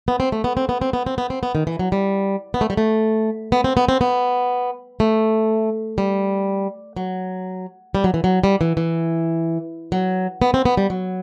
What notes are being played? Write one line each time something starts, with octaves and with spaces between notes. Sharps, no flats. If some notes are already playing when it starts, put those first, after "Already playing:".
B3
C4
A3
B3
C4
B3
C4
B3
C4
B3
C4
B3
D#3
E3
F#3
G3
B3
A3
G3
A3
B3
C4
B3
C4
B3
A3
G3
F#3
G3
F#3
E3
F#3
G3
E3
E3
F#3
B3
C4
B3
G3
F#3